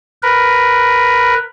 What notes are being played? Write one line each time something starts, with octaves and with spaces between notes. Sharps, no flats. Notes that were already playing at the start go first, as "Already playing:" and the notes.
A#4 B4